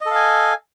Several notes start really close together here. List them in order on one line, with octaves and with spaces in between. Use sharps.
D#5 A4 F5 G#5